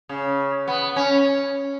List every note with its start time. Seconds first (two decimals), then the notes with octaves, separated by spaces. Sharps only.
0.09 C#3
0.68 B3
0.96 C#4